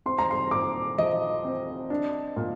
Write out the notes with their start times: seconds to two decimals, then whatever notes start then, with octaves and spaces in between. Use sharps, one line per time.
0.06 C4 C6
0.19 A#5
0.31 C6
0.51 A#2 D6
0.98 F3 D#5
1.45 C4
1.90 D4
2.36 A#2